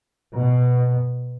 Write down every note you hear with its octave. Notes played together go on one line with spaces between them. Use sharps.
B2